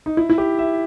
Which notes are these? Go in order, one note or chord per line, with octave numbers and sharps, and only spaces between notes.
D#4
E4
E4
G4
E5